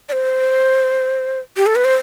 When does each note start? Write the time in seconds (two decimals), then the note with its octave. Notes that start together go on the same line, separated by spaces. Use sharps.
0.09 D5
0.12 C5
1.57 G4
1.66 A4
1.76 B4
1.85 C5